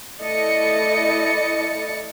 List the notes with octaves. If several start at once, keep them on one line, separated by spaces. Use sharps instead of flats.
A3 E4 D5 D#5 A6 C#7